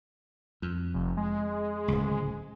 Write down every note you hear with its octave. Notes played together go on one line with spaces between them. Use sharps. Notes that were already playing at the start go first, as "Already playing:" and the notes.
F2
F1
G#3
D1 C#2